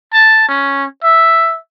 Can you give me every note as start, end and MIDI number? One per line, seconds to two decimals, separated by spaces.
0.13 0.45 81
0.48 0.84 61
1.03 1.57 76